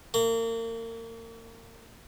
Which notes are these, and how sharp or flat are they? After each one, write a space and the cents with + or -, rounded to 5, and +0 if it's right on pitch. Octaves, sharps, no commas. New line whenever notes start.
A#3 -35